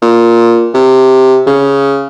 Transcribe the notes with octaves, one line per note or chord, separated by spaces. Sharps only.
A#2
C3
C#3